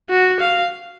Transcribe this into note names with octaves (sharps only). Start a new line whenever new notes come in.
F#4
F5